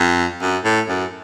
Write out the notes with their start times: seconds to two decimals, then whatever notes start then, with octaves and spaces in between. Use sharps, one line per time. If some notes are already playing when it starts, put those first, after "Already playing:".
Already playing: F2
0.41 F#2
0.64 A2
0.88 F#2